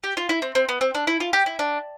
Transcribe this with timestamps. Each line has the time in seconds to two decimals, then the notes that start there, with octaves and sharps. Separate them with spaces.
0.04 G4
0.17 F4
0.29 E4
0.42 C4
0.55 C4
0.69 B3
0.81 C4
0.95 D4
1.07 E4
1.20 F4
1.33 G4
1.46 E4
1.59 D4